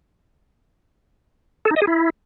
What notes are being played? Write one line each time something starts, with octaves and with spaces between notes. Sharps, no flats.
A4
D#4
D#5
G#4
E4